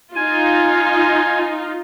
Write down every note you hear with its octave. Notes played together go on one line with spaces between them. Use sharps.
D#4 F4 G#5